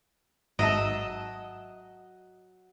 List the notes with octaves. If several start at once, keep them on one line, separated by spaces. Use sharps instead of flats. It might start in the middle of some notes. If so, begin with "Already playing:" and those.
G#1 G#2 F#3 D#5 E5 A5